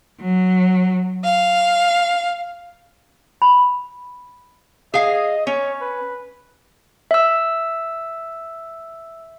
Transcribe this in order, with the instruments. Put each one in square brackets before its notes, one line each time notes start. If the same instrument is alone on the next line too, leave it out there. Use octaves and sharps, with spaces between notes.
[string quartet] F#3
F5
[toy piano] B5
[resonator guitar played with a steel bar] G#4 F5 [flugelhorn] D#5
[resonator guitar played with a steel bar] C#4 [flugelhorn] C#5
[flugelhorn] B4
[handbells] E5 E6